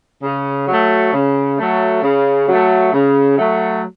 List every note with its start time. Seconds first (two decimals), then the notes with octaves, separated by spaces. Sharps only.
0.23 C#3
0.68 F#3 A3
1.13 C#3
1.58 F#3 A3
2.03 C#3
2.48 F#3 A3
2.93 C#3
3.38 F#3 A3